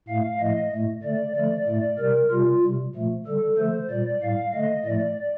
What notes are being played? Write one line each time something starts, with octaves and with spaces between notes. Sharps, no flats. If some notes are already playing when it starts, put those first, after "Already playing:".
A2 A3 F5
A2 F3 A3 D#5
A2 A3
D3 A3 D5
D3 F3 A3 D5
A2 A3
C3 G3 A#4
C3 G3 F4
C3 G3
A#2 F3 A3
D3 G3 A4
D3 F3 A3 C5
A#2 G3 D5
A2 G3 F5
D3 A3 D#5
A2 F3 A3 D5